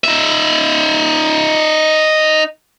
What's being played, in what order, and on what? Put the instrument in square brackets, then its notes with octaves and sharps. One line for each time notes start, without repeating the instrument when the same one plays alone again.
[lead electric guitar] D#4 E5